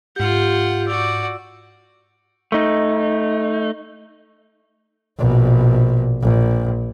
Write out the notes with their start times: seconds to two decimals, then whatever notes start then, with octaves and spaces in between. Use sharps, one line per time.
0.16 G#2 F4 G4 F#5 G6
0.87 F#4 D5 E6
2.52 A3 D#4
5.19 A#1 B2
6.23 A#1